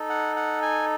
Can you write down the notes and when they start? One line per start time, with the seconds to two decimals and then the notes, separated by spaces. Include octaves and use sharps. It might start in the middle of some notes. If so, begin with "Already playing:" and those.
Already playing: D#4 A4
0.09 F#5
0.36 F#5
0.62 G#5